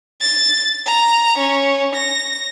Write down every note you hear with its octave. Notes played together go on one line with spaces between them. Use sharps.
A6
A#5
C#4
A#6